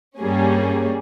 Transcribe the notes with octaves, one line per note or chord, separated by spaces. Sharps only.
G2 G3 A#3 C#4 G#4